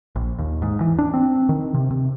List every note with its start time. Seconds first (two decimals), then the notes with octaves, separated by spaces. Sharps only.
0.16 A#1
0.39 D#2
0.62 G#2
0.81 E3
0.98 D4
1.14 C4
1.49 D#3
1.74 C3
1.91 C3